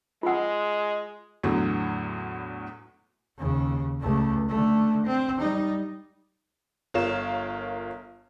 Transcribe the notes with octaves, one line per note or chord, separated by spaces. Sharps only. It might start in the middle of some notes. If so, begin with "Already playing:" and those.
G#3 F4 F#5
E2 A2 D3 F#3
D#2 C#3
C#2 A3
D3 A3
C4
G3 D#4
G1 F4 A#4 C#5 F5 E7